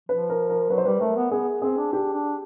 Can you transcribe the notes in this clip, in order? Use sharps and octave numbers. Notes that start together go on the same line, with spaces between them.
F3 B4
A#4
A#4
F#3 B4
C5
G3 B4
A3 A#4
B3
B3 G#4
C4 G#4
D4
D4 G4
D4